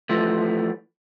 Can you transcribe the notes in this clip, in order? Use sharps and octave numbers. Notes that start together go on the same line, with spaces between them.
E3 F3 A3